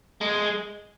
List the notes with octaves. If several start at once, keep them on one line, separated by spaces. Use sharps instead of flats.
G#3